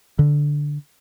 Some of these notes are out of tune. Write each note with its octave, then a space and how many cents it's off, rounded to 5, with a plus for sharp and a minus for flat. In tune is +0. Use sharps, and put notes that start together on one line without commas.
D3 +0